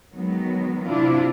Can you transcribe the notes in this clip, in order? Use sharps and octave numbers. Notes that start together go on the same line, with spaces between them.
D#3 F#3 G#3 B3
C3 D4 E4 F4